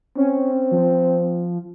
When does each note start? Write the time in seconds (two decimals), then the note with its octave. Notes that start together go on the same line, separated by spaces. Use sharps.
0.17 C4 C#4
0.71 F3